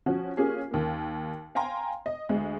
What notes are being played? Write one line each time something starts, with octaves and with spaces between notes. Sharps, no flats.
F3 C#4 F#4
A#3 C#4 F4 G4 G#4
D#2 A#3
F5 G5 G#5 A#5 C6
D#5
D2 G#3